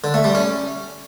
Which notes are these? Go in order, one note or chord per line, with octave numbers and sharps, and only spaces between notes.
D3
A3
G3
C#4